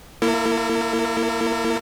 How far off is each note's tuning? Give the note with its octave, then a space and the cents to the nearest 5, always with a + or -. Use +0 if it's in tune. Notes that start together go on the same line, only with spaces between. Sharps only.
A#3 +0 E4 +15 A#4 -45